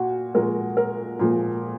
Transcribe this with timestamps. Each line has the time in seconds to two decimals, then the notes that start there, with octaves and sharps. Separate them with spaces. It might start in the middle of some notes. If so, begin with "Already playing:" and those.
Already playing: A#2 F#4
0.35 A#2 F3 G#3 A#4
0.77 A#4
1.19 A#2 F3 G#3